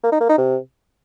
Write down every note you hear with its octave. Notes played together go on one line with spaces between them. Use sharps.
A#3
D#4
A#3
D#4
C3